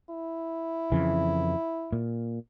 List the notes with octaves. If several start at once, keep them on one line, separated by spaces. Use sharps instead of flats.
E4
F2 C#3 E3
A#2